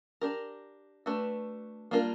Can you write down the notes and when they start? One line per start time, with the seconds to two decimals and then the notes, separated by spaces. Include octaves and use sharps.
0.21 D4 G4 A#4
1.06 A3 D4 F#4 B4
1.91 G3 A#3 D4 F4 A#4